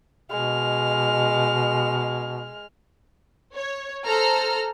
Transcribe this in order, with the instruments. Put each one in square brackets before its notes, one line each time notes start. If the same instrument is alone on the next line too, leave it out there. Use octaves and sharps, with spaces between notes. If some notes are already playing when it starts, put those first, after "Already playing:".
[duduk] B2 [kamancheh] G#3 F6
[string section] C#5
A4 C5 A#5 F6